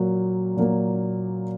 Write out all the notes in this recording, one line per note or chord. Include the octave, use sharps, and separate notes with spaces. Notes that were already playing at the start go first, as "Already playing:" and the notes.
Already playing: A#2 F#3 A#3
A#2 F#3 A#3